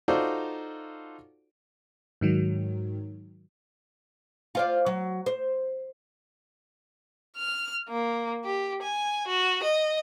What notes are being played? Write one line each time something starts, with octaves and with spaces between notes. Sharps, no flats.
D#4 F4 F#4 A4 C5 D5
G#2 D#3 F#3
F4 C5 D5
F#3
C5
F6
A#3
G4
G#5
F#4
D#5